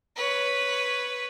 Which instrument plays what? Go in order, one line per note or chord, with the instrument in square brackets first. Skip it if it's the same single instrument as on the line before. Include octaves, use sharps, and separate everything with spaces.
[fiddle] B4 C#5